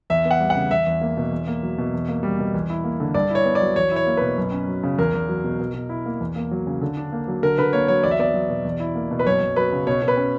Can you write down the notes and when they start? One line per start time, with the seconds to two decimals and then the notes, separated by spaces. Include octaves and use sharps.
0.10 E2 E5
0.25 B3
0.31 F#5
0.40 G3
0.50 F#5
0.55 C#3
0.71 E2 E5
0.86 E2
1.01 A#3
1.17 B2
1.31 E2
1.47 A#3
1.63 F#3
1.78 B2
1.93 E2
2.08 A#3
2.23 G3
2.39 B2
2.54 E2
2.70 E4
2.84 A#3
3.00 D3
3.15 G2 D5
3.30 E4 C#5
3.45 B3
3.55 D5
3.61 F#3
3.76 E2 C#5
3.91 E4 C#5
4.07 A#3
4.17 B2 B4
4.38 F#2
4.52 C#4
4.67 F#3
4.83 C#3
4.98 E2 A#4
5.14 E2
5.29 F#3
5.44 B2
5.60 B2
5.74 B2
5.89 E4
6.06 A#3
6.20 E2
6.36 A#3
6.51 F#3
6.67 C#3
6.81 D3
6.97 D4
7.12 A#3
7.28 F#3
7.43 D3 A#4
7.58 D3 B4
7.73 A#3 C#5
7.88 F#3 C#5
8.03 E2 D5
8.11 E5
8.19 B3 D5
8.34 F#3
8.50 B2
8.65 E2
8.80 E4
8.95 A#3
9.11 B2
9.19 B4
9.26 F#2 C#5
9.41 F#2
9.56 F#3 B4
9.72 C#3
9.87 B2 C#5
10.02 B2
10.08 B4
10.17 C#4